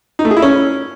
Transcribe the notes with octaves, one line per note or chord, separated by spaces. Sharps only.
D#4
A3
G#4
E4
C#4